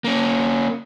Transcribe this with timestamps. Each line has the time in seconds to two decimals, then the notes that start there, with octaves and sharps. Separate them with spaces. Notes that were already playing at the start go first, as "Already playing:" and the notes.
0.04 A#3 C#4